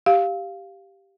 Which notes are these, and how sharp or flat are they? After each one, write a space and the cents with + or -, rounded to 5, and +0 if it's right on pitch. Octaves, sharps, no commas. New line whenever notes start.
G4 +0 F5 +0